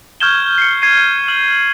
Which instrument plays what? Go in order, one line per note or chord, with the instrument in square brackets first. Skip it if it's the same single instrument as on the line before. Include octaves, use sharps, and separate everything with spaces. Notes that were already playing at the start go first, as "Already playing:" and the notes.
[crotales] C#6 F6 G6 G#6 E7 G7
C7 C#7
G#6 C7 C#7 D#7
F6 F#7